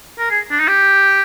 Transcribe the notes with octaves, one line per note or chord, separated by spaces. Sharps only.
A#4
G#4
D4
D#4
G4